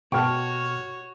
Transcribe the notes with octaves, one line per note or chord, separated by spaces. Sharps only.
B2 F#4 C#5 G5 A5 C#6 F6